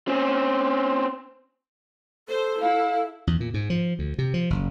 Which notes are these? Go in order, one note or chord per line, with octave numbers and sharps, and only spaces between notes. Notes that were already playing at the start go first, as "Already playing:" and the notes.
C4 C#4
A4 C5
E4 F5
E2
A#2
G#2
F3
D2
C3
F3
F#1